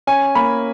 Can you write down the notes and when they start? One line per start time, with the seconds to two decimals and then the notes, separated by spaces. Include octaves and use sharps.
0.07 C#4 G#5
0.35 A#3 B5